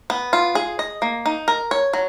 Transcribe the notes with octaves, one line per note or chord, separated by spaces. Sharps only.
B3
F4
G#4
D#5
A#3
D#4
A#4
C#5
F#3